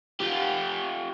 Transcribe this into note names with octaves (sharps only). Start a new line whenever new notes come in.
F4 G4